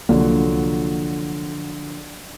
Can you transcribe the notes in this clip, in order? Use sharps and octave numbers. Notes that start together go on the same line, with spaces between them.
C2 D3 F3 F#3 A#3